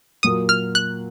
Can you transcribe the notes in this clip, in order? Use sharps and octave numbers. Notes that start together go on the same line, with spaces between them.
A#2 F#3 A#3 D#6
F6
F#6